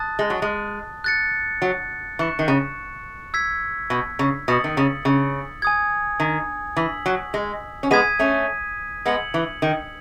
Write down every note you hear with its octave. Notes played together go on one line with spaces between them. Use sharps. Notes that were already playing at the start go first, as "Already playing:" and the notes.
Already playing: A5 D#6 F#6 A6
G#3
F#3
G#3
F#6 A6 C#7
F#3
E3 C#6 F#6 C#7 E7
D#3
C#3
E6 G#6 B6
B2
C#3
B2 D#6 A6 C#7 F#7
D#3
C#3
C#3
G#5 D#6 G#6
D#3
E3 E6 B6 F#7
F#3
G#3
C#4
G#3 B3 D#6 G#6 B6 D#7
A3 C#4
G#3 B3 E6 G#6 C#7 F#7
E3
D#3